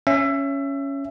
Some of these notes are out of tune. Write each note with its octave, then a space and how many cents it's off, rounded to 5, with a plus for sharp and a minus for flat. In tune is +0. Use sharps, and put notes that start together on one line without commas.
C#4 +0 E5 +25